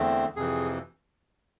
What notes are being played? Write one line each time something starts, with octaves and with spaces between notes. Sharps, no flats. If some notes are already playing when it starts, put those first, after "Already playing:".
Already playing: E2 D3 A3 C4
F2 C3 E3 G#4